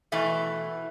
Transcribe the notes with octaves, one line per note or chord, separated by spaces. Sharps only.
B2 E3 A3 E4